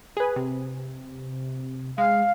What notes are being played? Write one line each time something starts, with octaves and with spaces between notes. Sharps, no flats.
G#4 B4
C3
G#3 F5